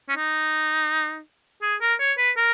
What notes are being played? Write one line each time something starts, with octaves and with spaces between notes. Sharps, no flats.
C#4
D#4
G#4
A#4
C#5
B4
A#4